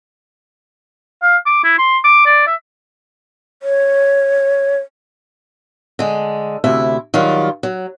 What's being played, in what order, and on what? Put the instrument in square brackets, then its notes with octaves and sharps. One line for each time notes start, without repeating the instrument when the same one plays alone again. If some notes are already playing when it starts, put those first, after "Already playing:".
[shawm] F5
D6
E4
C6
D6
D5
E5
[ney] C#5
[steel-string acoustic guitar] D3 G#3
D2 C3 E4 E5
D#3 F#3 G3 F4
F#3